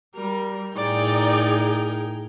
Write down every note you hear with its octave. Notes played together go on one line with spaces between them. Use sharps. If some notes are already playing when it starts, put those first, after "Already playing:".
G3 A#4
A2 D#4 G#4 A#4 D5 G5